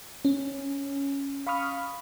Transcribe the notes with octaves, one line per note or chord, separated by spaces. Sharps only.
C#4
F5 B5 C#6 D#6 F6